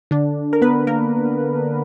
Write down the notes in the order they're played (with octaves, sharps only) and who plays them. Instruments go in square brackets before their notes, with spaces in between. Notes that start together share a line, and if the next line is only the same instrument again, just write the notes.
[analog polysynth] D3 D4
A#4
B3 B4
A#3 A#4